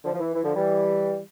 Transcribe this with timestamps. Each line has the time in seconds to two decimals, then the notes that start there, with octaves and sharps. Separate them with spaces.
0.04 D3 F3
0.14 F3
0.19 E3
0.34 E3
0.43 D3 F3
0.55 E3 G3